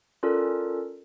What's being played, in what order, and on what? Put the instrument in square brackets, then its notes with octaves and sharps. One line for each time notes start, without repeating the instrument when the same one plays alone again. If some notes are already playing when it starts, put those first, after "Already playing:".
[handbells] C#4 F4 A4 A#4 D5